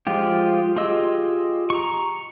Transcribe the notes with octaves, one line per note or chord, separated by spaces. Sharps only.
F3 G#3 F4 G4
F4 G4 G#4 D#5 E6
A#5 C#6